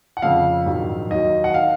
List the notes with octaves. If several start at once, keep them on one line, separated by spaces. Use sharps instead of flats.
F#5
F2 C#3 F3 F5
A#1 G#2 D#3 F#3
D#2 D#3 F#3 D#5
F#5
D#3 F5